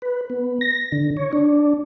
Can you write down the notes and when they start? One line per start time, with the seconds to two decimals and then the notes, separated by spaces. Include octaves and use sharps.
0.02 B4
0.30 B3
0.61 A#6
0.92 D3
1.17 C#5
1.33 D4